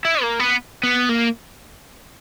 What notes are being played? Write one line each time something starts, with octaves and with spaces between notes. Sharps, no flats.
E4
A#3
B3
B3
A#3